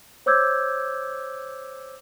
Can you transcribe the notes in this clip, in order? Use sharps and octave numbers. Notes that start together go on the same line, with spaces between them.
C5 C#5 D6 E6 G6 G#6